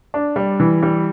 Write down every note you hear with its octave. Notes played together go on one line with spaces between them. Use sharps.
D4
G3
E3
G3